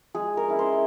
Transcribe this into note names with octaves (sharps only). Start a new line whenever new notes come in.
G#3 G#4
A#4
C#4 E4
C5